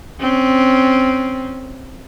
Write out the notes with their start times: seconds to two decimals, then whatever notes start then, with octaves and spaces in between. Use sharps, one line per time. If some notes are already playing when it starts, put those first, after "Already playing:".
0.20 C4 C#4